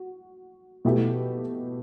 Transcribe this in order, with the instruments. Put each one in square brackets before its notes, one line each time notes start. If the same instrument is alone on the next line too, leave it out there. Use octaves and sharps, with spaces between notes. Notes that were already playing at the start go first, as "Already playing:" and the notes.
Already playing: [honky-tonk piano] F#4
B2 A3 E4 G4